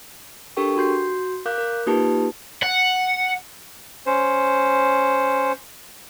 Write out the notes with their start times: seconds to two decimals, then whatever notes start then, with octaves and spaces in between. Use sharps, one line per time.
0.57 D4 G4 A4 A#4 G5 C#6
0.77 F#4 C6 G6 C7
1.45 A#4 F5 D6 F#6 G6
1.58 A#4
1.87 A#3 D#4 F4 G4 B4 A5
2.63 F#5
4.06 C#4 C5